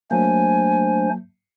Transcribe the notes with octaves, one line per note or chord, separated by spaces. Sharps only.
F#3 A3 A#3 D4 C5 G#5